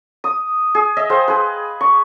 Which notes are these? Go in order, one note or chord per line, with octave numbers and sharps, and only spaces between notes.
D#6
G#4
D#5 E5
G#4 C5 F5 G5
G#4 B4
C#6